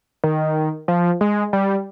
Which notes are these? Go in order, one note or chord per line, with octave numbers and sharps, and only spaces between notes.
D#3
F3
G#3
G3